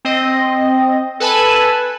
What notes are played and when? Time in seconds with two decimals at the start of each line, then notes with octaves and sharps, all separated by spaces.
0.05 C4 D#5
1.20 A4 B4 G#5 A5 B5